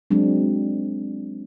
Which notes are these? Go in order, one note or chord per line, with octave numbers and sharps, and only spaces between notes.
F#3 G#3 C4 D4